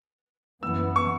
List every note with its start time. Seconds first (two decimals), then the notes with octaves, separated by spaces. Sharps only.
0.62 F#2 E3 B3 E6
0.96 C#6